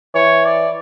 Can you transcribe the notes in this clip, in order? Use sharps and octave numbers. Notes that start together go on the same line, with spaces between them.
E3 C#5
D5